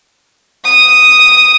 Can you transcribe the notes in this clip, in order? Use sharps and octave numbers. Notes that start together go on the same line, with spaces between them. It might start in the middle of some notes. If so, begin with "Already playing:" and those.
D#6